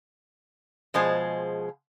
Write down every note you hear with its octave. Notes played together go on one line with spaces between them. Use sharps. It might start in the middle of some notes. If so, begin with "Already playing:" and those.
B2 F3 G#3 G#4 C5